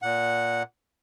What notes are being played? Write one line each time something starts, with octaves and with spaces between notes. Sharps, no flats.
A#2 F#5